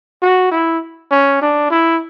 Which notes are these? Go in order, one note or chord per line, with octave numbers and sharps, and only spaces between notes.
F#4
E4
C#4
D4
E4